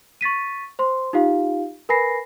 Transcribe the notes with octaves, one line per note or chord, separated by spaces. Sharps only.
C#6 A6 B6 D#7
C5 C6
D#4 F4 G4 F5
A#4 B4 G#5 B5 A#6 C7